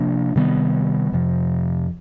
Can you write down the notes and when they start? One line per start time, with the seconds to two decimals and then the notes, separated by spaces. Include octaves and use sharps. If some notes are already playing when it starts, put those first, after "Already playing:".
Already playing: C3 F3 A#3 D4
0.36 C3 D#3 G3 B3
1.12 F2 C3 F3